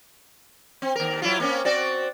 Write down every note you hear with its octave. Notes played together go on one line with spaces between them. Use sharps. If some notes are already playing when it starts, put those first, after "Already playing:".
C4
D#2 A#4
F#3 E4 F4
A#3 C4 C#4
C4 F#4 D5